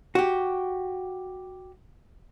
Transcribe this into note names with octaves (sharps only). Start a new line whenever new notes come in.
F#4 G4